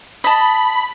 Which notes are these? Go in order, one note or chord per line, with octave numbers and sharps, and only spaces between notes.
D#5 A5 B5